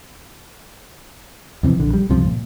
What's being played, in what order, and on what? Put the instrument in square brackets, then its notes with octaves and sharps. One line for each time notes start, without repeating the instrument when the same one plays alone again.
[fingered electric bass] F2 C3 E3
A#1 D3
G3
C#2 G2 C3 F3
A#2